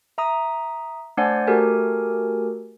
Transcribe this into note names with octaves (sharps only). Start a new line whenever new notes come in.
E5 A#5 D#6
A3 D4 C5 D5 F#5 G#5
A3 F#4 G4 A4 A#4 G#5